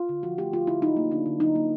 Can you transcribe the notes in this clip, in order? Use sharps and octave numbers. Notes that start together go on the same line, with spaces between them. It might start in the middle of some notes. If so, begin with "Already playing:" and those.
Already playing: F4
D3
F3 F#4
A3 G4
D3 F4
D3 E4
F#3 D#4
A#3
D3 D4
D3
F#3 D#4
A#3